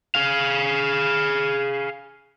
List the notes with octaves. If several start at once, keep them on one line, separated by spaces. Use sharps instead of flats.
G#4 F5